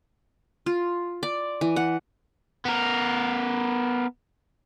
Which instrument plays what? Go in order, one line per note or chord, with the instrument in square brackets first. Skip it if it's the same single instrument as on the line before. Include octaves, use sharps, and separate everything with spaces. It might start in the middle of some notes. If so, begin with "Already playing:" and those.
[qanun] F4
D5
E3
F#5
[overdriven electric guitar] B3 A#4